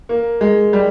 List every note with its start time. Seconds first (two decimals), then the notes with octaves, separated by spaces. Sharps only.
0.09 A#3
0.41 G#3
0.73 G3